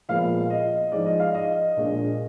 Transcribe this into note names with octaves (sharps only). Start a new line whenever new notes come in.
A#2 F3 G#3 B3 F4 F5
D#5
G#2 F3 G#3 D5
D#5
F5
D#5
A#1 A#2 G#3 D4